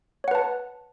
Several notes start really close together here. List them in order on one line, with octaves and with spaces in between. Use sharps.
C#5 F#5 B4 A5